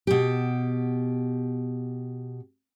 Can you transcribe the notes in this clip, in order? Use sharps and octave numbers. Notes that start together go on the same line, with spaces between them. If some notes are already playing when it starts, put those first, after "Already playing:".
B2 G4